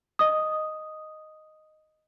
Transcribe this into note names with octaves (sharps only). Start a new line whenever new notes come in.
D#5 D#6